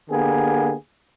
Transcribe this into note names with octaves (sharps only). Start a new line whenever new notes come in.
D3 A#3 B3 G4 G#4